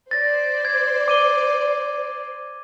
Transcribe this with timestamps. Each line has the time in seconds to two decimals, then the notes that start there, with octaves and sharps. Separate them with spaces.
0.11 C5 D5 A6 A#6
0.65 G#6
1.08 D6 D#7 G7